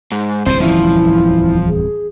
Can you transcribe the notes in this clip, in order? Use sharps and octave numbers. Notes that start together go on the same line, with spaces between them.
G#2
D1 C2 E3 C4 C5
E2 F3 C#4 E4 E5
G#4